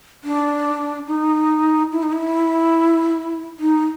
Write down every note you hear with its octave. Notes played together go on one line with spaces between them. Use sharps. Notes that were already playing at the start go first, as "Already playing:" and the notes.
D4
D#4
E4
D#4
E4
D#4